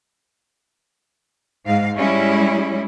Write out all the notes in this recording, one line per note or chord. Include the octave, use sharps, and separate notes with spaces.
G#2 F5
G3 G#3 C#4 E4